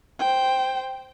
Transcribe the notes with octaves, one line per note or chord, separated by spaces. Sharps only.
C5 G5